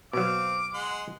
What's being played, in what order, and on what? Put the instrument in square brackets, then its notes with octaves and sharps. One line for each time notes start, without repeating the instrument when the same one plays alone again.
[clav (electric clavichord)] B2 F#3 [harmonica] C4 F5 [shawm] D6
[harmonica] G#3 F#5 C6